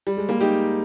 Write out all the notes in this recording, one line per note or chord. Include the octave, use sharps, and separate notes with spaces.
G3
G#3
G3 A#3
D#4 G4